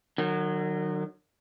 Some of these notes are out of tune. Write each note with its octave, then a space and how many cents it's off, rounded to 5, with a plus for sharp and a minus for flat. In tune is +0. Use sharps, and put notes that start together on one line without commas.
D#3 -40 F#3 +0